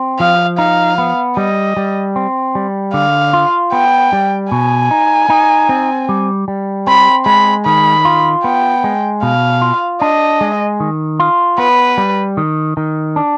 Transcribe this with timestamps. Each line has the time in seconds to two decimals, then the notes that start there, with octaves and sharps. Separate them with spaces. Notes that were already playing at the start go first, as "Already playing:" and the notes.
Already playing: C4
0.19 F3 F5
0.58 D#4 F5
0.98 B3
1.37 G3 D#5
1.77 G3
2.16 C4
2.55 G3
2.94 D3 F5
3.33 F4
3.72 B3 G5
4.13 G3
4.52 B2 G#5
4.91 D#4
5.30 D#4
5.69 C4
6.09 G3
6.48 G3
6.87 C4 B5
7.26 G#3 B5
7.66 D#3 B5
8.05 F4
8.44 B3 G5
8.84 G#3
9.23 B2 F5
9.62 F4
10.02 D4 D#5
10.41 G#3
10.80 D#3
11.20 F4
11.58 B3 B4
11.98 G3
12.37 D#3
12.77 D#3
13.16 D4